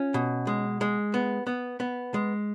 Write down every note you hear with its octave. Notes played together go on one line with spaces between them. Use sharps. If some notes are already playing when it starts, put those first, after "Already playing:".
Already playing: C#4 F4
B2
G#3
G#3
B3
B3
B3
G#3